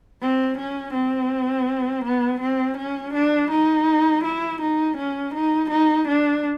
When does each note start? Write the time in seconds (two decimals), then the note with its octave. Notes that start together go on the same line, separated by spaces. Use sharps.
0.22 C4
0.58 C#4
0.94 C4
2.05 B3
2.41 C4
2.78 C#4
3.14 D4
3.51 D#4
4.24 E4
4.61 D#4
4.98 C#4
5.35 D#4
5.70 D#4
6.08 D4